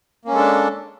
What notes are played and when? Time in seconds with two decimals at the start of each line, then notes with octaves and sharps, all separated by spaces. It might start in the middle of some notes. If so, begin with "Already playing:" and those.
0.25 A#3
0.28 C#4
0.32 G#3
0.35 A4
0.38 D4